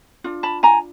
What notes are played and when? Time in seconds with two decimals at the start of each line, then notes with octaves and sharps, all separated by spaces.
0.24 D4 F4
0.43 A5 B5
0.63 G#5 A#5